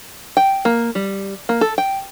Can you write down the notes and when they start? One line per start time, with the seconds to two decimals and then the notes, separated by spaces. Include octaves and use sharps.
0.37 G5
0.65 A#3
0.95 G3
1.49 A#3
1.61 A4
1.78 G5